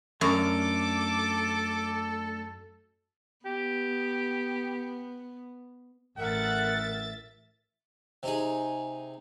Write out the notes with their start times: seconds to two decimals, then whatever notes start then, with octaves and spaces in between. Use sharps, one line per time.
0.21 F#2 A3 D4 A4 A#4 D6
3.45 B3 G4
6.18 A1 A#4 E5 F#5 A6
8.23 C3 D#4 G#4